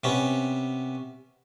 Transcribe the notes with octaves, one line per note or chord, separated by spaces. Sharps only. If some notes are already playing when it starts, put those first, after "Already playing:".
C3 B3 C#4